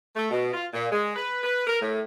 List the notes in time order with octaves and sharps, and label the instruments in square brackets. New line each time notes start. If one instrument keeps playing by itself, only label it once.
[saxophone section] A3
B2
F4
A#2
G#3
B4
B4
A#4
A2